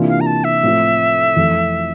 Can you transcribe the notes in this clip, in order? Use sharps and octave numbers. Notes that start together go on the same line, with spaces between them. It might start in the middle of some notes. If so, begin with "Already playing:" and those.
Already playing: C3 E3 A#3 D4 F4
F5
A#5
A5
E5
A2 F3 C4 F4
F2 E3 A3